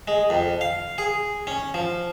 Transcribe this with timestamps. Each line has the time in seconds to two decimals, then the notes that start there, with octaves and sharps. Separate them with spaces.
0.08 G#3
0.30 F2
0.61 F5
0.98 G#4
1.47 C#4
1.74 F3